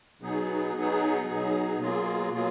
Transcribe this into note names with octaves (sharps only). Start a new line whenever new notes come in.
B2 F#3 B3 D#4 G#4
B2 F#3 B3 D#4 G#4
B2 F#3 B3 D#4 G#4
B2 F#3 A#3 F4 G#4
B2 F#3 A#3 F4 G#4